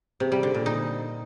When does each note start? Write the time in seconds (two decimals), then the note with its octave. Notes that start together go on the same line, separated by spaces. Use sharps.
0.20 C3
0.32 G3
0.43 D3
0.54 A#2
0.66 D#4